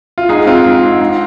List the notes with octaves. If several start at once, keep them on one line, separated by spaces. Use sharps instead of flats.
F4
G#2 D#4 G#4
G#2 C4 F4
G#2
G#2
G#2